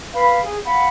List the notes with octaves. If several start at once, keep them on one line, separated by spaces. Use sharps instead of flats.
B4 F5 B5
G#4
F5 F#5 B5